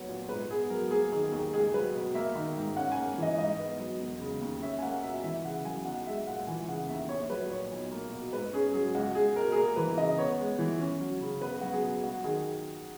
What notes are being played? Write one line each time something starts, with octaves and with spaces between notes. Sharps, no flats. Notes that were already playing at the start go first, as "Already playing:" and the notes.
Already playing: D#2 F#3 B3 C#5
A#2
G#2 B4
B3 G#4
F#3 A#4
A#3 G#4
D#3 G#4
D#2 G#4
C#2 G#4
F#3 B4
B2
A#3 E5
D#3
G#2
C#4 F#5
A#3 G#5
E3 D#5
G#2 D#5
B3
F#3
E1
C#3
D#2
C#4 E5
G#5
A#3 F#5
B2 E5
E3 E5
C#3 F#5
F#2 G#5
B1 F#5
G#3 E5
A#2 F#5
E3 G#5
C#3 F#5
D#2 E5
A#1 C#5
F#3 B4
A#2 C#5
B1
A#3
B2
G#2 B4
C#4 G#4
F#3 G#4
C#2 F#4
G#3 G#4
B2 A#4
G#4
A#3 A#4
E3 B4
C#3 D#5
B3 C#5
G#3
E3
C#4
F#3
C#3
B3 B4
F#3 F#4
G#4
B2
F#3 F#4
D#3 G#4